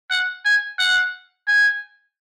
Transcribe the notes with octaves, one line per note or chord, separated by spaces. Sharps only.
F#5
G#5
F#5
G#5